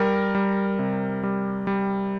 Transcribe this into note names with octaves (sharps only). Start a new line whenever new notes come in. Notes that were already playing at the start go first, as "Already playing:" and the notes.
Already playing: G3 A#4
G3
C3
G3
G3